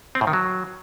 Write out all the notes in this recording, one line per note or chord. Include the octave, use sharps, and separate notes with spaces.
C4
A2
D#3
F#3